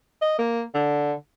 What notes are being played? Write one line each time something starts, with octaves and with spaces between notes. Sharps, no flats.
D#5
A#3
D3